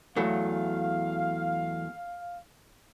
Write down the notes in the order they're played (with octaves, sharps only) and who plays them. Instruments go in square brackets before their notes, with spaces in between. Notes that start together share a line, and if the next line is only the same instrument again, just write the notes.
[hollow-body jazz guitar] E2 F#3 A3 [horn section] F5